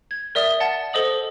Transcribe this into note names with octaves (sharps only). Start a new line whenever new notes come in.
G#6
A#4 D5 E5 D#6 G7
F#5 A5 A6
A4 C5 D#5 D#6 F#7